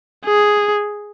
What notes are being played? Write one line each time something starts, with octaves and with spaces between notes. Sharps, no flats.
G#4